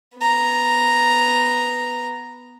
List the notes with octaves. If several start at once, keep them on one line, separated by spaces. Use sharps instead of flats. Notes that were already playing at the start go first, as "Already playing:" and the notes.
B3 A#5